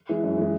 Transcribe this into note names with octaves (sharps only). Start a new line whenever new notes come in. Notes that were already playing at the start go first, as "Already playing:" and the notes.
E3 G#3
F#2
E3 G#3